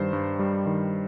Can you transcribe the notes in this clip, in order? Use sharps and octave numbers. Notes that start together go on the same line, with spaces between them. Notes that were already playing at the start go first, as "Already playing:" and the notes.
Already playing: G2 D#3 G3 C5
G2
G3
D#3